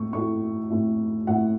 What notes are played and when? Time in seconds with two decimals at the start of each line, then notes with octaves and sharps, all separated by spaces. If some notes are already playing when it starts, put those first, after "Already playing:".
Already playing: A2 A3 C#6
0.13 A2 A3 E4 C#6
0.70 A2 A3 E4
1.27 A2 A3 E4 F#5